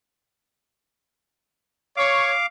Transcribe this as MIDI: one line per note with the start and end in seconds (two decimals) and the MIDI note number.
1.97 2.32 73
1.97 2.46 77
1.97 2.46 86